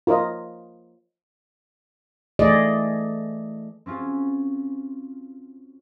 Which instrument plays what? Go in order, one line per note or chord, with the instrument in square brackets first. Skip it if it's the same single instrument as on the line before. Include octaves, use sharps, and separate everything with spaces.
[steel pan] F4 A#4 C#5 D#5
[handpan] E3 A3 G#4 D5 D#5
[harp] C4 C#4 F4 F#4 G#4